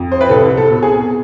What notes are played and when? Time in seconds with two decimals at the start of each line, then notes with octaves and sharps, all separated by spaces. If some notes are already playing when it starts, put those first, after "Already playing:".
Already playing: F2
0.12 C5
0.21 B4
0.30 C2 A4
0.57 A4
0.70 B2
0.83 G#4